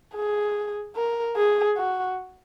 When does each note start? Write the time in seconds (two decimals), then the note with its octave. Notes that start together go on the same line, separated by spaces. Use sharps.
0.15 G#4
0.96 A#4
1.36 G#4
1.77 F#4